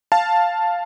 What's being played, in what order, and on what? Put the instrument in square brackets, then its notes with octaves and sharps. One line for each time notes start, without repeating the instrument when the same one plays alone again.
[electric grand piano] F5 A5